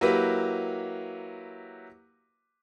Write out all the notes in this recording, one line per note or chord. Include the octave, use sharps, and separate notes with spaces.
F#3 A#3 E4 G4 B4